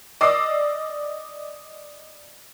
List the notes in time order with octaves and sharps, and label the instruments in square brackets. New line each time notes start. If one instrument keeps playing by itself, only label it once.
[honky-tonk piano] D5 D#5 D6 E6 C7